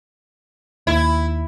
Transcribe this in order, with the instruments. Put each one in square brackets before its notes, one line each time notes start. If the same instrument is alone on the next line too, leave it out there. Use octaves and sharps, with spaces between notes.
[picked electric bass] D#2 [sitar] E4